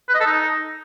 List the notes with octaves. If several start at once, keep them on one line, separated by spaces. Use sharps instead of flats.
B4
D#5
A4
D#4